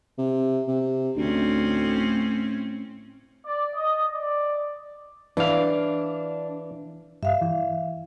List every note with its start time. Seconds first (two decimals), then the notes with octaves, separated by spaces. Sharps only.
0.18 C3
0.68 C3
1.17 D2 A2 C4 C#4
3.45 D5
3.75 D#5
4.11 D5
5.37 E3 D4 F5
7.23 G2 E5 F5
7.41 E3